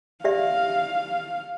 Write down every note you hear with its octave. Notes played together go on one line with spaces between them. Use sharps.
G4 D5 E5 F5